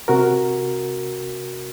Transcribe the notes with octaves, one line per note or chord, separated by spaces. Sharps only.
C3 F#4 A#4